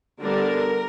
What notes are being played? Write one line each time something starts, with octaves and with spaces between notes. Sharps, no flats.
D3 G3 B3 D4 A#4